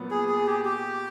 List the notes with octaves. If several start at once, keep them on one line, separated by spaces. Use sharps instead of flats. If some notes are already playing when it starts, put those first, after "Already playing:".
Already playing: A#2 F#3 B3
G#4
G#4
G4
G4